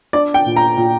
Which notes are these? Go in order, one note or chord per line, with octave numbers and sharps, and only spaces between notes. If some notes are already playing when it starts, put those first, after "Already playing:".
D4 D5
G5
A#2
A#5
A#2